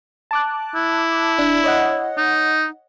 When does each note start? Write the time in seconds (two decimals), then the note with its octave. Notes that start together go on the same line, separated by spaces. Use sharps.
0.31 A5 D6 F#6
0.75 E4
1.38 D4
1.64 C#5 D#5 F#5
2.18 D#4